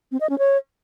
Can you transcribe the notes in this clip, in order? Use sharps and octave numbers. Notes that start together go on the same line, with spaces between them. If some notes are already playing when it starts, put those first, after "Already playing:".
C4
D#5
C#4
C#5